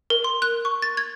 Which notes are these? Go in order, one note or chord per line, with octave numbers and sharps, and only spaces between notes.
A#4
C6
F#6
C#6
A6
G#6